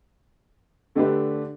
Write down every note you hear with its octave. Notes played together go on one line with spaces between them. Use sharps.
D3 A3 D4 G4 B4